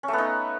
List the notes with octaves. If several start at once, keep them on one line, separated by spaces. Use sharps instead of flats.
C#4
A3
B3
D#4